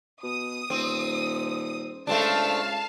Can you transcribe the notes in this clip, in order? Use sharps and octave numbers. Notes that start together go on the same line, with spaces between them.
B2 D#6
D#1 C4
C#2 A3 C4 D4 F5 A5